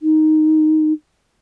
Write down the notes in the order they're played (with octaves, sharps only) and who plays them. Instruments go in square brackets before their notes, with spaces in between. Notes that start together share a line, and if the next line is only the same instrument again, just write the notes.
[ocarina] D#4